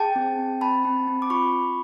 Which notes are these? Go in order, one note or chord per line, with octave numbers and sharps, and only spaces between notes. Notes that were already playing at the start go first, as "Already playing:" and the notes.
Already playing: G#4 G5 A5
C4
C4
C4 A5 B5
C4
C4
D6
F4 B5 C#6